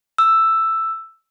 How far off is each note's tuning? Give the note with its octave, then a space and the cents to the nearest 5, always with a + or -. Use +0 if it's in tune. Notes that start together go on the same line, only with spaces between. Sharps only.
E6 +5